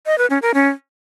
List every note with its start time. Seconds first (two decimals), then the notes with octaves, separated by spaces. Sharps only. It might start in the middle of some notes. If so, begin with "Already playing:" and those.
0.06 D#5
0.18 B4
0.30 C#4
0.42 A#4
0.54 C#4